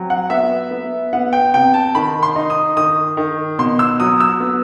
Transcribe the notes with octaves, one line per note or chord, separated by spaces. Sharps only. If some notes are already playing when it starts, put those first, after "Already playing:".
Already playing: F#3 C4
F#5
B3 E5
B3
B3 F#5
G5
C3 G5
A5
D#3 B5
C6
D#4
D#6
D#3 D#6
D#3
B2 C6
E6
F#3 D#6
E6
B3